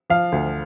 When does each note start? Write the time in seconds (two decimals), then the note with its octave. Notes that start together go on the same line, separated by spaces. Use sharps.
0.10 F3 F5
0.32 D2